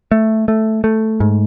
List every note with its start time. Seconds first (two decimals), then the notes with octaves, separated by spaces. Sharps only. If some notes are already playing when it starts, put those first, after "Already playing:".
0.11 A3
0.48 A3
0.84 A3
1.20 G#2